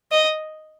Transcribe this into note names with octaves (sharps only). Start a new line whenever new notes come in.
D#5